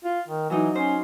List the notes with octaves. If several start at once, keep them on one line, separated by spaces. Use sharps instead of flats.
F4
D#3
E3 F#3 D#4
C#4 C5